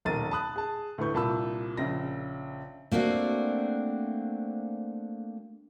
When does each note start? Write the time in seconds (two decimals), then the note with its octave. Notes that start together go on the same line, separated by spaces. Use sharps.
0.05 D#1 B1 A#4 A6 D#7
0.31 A5 B5 D#6 F#6
0.56 G#4 A5
0.98 D2 A2 B4 C#6 G6
1.14 C2 A#2 A5 B5 E6
1.77 A#1 C#3 A#6
2.91 A3 A#3 C4 D4 F#4